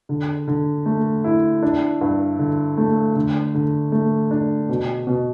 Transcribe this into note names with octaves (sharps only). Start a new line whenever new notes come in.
D3
D3
A3
E4
D4
G2
D3
A3
D3
D3
A3
D4
B2
B2